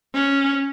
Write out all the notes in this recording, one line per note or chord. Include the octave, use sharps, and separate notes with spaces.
C#4